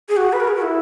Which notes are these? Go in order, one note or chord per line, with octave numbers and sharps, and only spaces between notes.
G#4
F#4
B4
A#4
G#4
F#4
E4